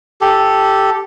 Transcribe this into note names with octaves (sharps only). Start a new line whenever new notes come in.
G4 A4